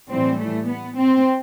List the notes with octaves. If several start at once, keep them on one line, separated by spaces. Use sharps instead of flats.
A2 E3 G3 C4
A3
B3
C4